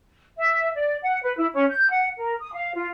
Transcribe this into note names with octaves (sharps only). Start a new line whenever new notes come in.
E5
D5
F#5
B4
E4
C#4
G6
F#5
A#4
D#6
F5
F4